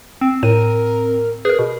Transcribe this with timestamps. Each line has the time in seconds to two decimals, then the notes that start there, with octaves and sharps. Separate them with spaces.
0.21 C4
0.43 A2 A#4 D#7
1.45 G#4 A#4 B4
1.59 B2